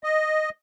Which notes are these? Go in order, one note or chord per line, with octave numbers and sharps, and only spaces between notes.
D#5